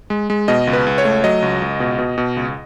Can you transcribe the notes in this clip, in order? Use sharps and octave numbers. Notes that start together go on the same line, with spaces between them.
G#3
G#3
B2 D#5
C#2
B4
C#2
C#5
A3
F#3 D#5
C#2
C#2
B2
B2
B2
C#2